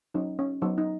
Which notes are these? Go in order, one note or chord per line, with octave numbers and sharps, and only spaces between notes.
F#3 C#4 D#4
C#4
F#3 B3 D#4
D#4